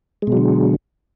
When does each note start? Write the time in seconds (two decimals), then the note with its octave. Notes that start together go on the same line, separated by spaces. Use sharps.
0.22 G#3
0.27 B2
0.32 F#3
0.37 D3